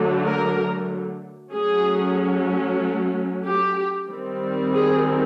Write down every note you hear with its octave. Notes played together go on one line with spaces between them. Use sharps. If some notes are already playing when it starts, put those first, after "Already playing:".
Already playing: D3 F#3 A3
A#4
F#3 A3 C#4 G#4
G4
D#3 G3 C4
G#4